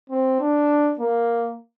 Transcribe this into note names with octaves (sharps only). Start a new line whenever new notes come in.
C4
D4
A#3